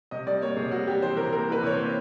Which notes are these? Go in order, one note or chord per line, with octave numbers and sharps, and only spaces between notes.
C3 D#5
G3 D5
A#3 C#5
C3 G#4
G3 F#4
G3 G4
E3 C5
C3 A#4
A#3 A#4
E3 B4
C3 C#5
C5
A#3